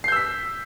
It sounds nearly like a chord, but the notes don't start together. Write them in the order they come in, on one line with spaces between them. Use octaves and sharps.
C7 G6 E6 B6